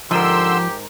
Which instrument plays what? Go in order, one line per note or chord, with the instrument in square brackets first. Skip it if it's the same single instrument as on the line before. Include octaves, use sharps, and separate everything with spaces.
[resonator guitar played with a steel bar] G#2 A#4 [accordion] D3 C6 E6 [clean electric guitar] F3 [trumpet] G4